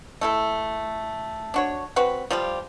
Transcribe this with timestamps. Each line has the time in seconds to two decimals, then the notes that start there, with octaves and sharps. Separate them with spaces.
0.21 A3 E4 A4
1.54 D4 F#4 C#5
1.96 C4 F#4 B4
2.30 F3 G3 F4 G4